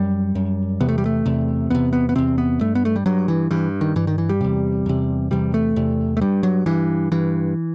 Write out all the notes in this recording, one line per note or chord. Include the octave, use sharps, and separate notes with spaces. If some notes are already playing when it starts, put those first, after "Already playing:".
Already playing: F#2 G3
F#2
E2 C3 B3
A3
G3
A3
E2 C3
E2 C3 B3
B3
B3
E2 C3 C4
B3
G2 A3
B3
A3
G3
G2 F#3
E3
G2 E3
D#3
G2 E3
D#3
E3
G3
E2 C3
E2 C3
E2 C3 G3
A3
E2 C3
A3
G2 G3
F#3
G2 E3
G2 E3